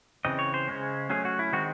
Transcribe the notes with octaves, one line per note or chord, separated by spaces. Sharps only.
C#3 E3 C4 D#5
C#5
C5
C#3 G#3 C#4
F#3 A3 C#4 G#4
F#4
E4
D#3 G#3 C4 F#4